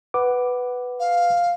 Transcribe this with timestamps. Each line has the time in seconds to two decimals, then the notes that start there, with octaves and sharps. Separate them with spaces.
0.14 B4 F#5 D6
1.00 F5